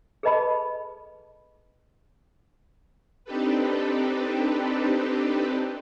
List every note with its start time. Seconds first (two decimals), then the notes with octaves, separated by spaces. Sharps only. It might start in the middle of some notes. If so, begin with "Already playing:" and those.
0.23 G#4 A4 B4 D#5 A5 B5
3.24 C4 D4 D#4 G4 A4 B4